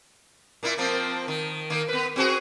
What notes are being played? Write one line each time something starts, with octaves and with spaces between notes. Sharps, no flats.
A#2 A#3 E4
F3 A#3 C4
D#3
D#3 A#3
B3 B4
C4 F#4 G#4